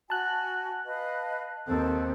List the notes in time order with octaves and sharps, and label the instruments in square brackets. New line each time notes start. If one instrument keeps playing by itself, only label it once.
[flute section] F#4 G#5 [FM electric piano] A5 F#6
[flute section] B4 D#5 F5
[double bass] D#2 C4 [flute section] A4